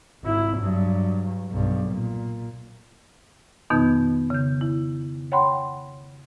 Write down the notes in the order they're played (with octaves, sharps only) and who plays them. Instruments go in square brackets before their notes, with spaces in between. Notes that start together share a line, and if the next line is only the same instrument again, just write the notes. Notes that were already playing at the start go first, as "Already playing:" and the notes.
[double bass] G#1 E4
G2 F#3
B1 G2
A#2
[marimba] F2 B2 D#3 B3 D#4 G6
C#3 G6
E4
C#5 F#5 G5 B5 C6